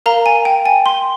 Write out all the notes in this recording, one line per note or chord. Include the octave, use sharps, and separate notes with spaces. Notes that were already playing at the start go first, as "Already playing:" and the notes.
A#4 F5 A#5
G#5
G5
G#5
C6